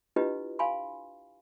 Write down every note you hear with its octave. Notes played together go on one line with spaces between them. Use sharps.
D4 E4 F4 G4 B4 D#5
F5 G#5 B5 C6